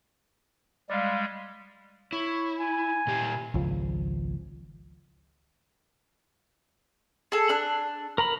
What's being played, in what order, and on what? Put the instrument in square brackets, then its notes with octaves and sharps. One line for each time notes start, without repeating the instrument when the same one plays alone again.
[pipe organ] G3 G#3 [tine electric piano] D5 F5
[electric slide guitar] E4 [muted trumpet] C#5
[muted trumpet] G#5
[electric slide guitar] A#2 G4
[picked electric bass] G#1 C#2 F3
[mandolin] G#4 A4
D4 F#6
[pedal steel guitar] A#4 A#5 B5